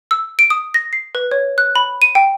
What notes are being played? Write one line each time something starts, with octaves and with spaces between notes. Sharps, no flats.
E6
D7
D#6
A#6
C7
B4
C#5
F#6
B5
D#7
G5